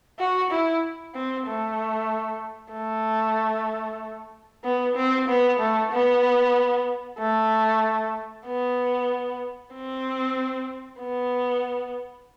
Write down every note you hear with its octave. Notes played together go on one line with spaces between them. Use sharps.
F#4
E4
C4
A3
A3
B3
C4
B3
A3
B3
A3
B3
C4
B3